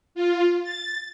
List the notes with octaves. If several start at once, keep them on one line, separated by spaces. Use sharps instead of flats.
F4
A6